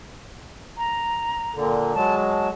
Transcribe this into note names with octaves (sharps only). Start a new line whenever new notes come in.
A#5
A#2 D3
F#3 G#3 A5
A5